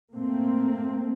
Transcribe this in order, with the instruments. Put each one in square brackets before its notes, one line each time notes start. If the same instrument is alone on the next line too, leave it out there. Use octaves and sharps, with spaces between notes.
[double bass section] A#2 A3 A#3 C4